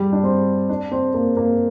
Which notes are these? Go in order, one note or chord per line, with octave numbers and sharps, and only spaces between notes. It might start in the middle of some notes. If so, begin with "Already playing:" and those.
Already playing: G3
D4
C4
D4
C4
A#3
A#3